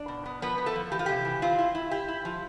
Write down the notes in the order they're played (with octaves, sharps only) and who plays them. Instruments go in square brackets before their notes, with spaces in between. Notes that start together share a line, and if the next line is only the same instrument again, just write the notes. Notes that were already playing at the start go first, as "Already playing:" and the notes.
Already playing: [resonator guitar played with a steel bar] D4 D5
B2
B3
F3 B3 B4
B3
A3 A4
F3
E3 G4
F4
C3 G4
E3
C4 F4
E4
E4
E4 G4
E4
F3